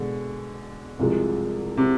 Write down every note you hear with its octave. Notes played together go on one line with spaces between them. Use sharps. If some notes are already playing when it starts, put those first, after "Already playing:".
Already playing: B2 D3 G#3
C2 C3 F3 G#3
C3